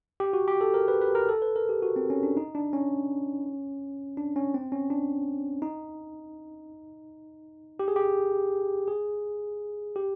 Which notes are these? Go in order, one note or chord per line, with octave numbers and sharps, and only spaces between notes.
G4
F#4
G4
A4
A#4
B4
B4
A#4
A4
B4
A#4
G4
F#4
C4
C#4
D4
D#4
D4
C#4
D4
C#4
C4
C#4
D4
D#4
G4
G#4
G4
G#4
G4